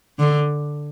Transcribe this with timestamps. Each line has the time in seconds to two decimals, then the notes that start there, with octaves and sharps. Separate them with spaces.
0.19 D3